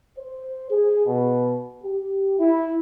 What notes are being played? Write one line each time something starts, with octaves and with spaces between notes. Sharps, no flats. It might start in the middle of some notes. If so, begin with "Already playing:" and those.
C5
G#4
B2
G4
E4